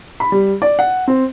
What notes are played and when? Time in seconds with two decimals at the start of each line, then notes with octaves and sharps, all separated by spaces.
0.20 B5
0.32 G3
0.62 D5
0.79 F#5
1.08 C4